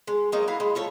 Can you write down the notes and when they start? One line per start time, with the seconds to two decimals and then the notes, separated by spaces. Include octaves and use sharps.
0.07 G#3
0.32 F#3 G#3 A#3 D#4
0.48 E4 F#4 F5
0.60 G#3
0.75 F4 A4 C#5